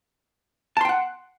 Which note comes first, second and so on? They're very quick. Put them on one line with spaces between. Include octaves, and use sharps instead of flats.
A5 C6 G5 F#5